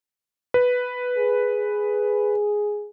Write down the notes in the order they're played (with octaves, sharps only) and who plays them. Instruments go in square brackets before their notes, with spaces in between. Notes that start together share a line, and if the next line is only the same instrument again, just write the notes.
[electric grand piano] B4
[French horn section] G#4